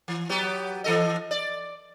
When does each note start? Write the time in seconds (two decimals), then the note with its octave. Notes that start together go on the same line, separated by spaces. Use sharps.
0.08 E3
0.29 F#3 B3 G4
0.84 E3 A4 D#5
1.31 D5